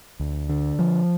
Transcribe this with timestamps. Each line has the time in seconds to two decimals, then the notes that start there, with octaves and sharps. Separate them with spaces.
0.20 D2
0.49 D3
0.79 F3